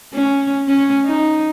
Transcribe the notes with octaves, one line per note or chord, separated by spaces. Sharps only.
C#4
C#4
D#4